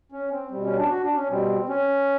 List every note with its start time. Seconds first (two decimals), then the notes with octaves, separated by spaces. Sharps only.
0.12 C#4
0.31 C4
0.51 B2 G3 C4
0.65 C#4
0.78 D4
0.91 F#4
1.04 D4
1.16 C#4
1.30 B2 G3 C4
1.69 C#4